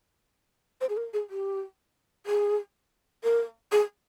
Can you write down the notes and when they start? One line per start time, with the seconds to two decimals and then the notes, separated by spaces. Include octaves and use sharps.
0.81 C5
0.89 G#4
0.97 A#4
1.13 G#4
1.30 G4
2.26 G#4
3.24 A#4
3.72 G#4